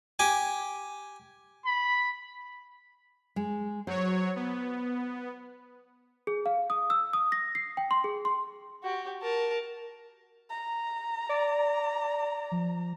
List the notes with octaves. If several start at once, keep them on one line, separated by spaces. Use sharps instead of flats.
G4 G#5
B5
G#3
F#3 C5 C#5
B3
G#4
F5
D#6
E6
D#6
A#6
C7
G5
C6
G#4
C6
F#4 G4
A#4 A5
A#5
D5
F3